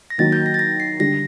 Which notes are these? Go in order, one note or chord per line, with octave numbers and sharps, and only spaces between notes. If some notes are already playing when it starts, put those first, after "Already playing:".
A#6
D#3 F#3 A#3 A6
G6
A#6
A6
A#6
C7
D3 G3 D4 A#6